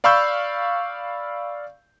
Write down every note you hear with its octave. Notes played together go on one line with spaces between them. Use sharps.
D5 F5 B5 C#6 E6 G6